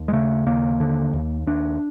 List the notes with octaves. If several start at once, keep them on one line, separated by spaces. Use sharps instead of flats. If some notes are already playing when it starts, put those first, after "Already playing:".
Already playing: D#2
G#3
C#3 A3
D#2 A#3
D3
D#2
D#2 D4